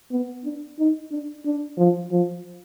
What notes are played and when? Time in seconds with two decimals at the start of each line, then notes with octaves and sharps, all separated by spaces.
0.12 B3
0.45 D4
0.79 D#4
1.11 D4
1.46 D4
1.78 F3
2.11 F3